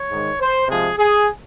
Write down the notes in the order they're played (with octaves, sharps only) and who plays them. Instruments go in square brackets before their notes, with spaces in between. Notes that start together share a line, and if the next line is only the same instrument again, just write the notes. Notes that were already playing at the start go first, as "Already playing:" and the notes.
Already playing: [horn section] C#5
G#2 D#3 G#3
C5
C3 F3 G#3 G#4
G#4